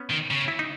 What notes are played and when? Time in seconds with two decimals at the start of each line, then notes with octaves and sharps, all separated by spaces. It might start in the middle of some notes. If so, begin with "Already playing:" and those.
Already playing: B3 C#4
0.10 D#3
0.31 C#3
0.48 E4
0.59 D#4